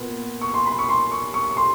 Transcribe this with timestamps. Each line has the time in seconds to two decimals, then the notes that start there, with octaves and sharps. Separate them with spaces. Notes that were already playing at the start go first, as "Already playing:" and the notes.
Already playing: A#2 B3
0.41 C#6
0.54 C6
0.66 B5
0.79 C#6
0.89 C6
1.12 C#6
1.34 C#6
1.50 C#6
1.57 C6